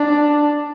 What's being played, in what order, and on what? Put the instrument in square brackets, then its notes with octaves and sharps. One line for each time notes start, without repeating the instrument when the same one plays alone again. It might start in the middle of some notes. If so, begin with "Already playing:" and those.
Already playing: [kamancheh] D4